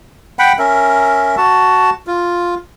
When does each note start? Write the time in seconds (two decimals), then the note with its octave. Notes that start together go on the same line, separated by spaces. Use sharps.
0.39 F#5 G5 B5
0.59 C#4 A#4 E5
1.37 F#4 A5
2.07 F4